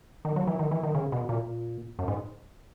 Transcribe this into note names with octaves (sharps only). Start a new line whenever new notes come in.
D#3
F#3
E3
D#3
E3
D#3
C#3
B2
A#2
F#2
G#2